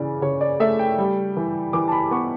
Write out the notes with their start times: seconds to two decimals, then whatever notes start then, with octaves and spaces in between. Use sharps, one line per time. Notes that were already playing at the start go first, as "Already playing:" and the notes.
Already playing: C#3 E3 D5
0.22 C#3 C#5
0.41 D5
0.60 A3 E5
0.79 G5
0.98 G3
1.36 E3
1.73 E3 D6
1.88 A5
1.92 B5
2.11 B3 C#6